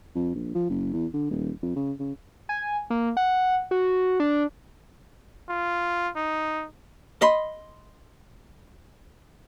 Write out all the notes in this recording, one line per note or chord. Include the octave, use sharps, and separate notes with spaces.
F2
A#1
F3
F#1
E2
D3
D#1
F2
C#3
C#3
G#5
A#3
F#5
F#4
D4
F4
D#4
D#5 B5 C6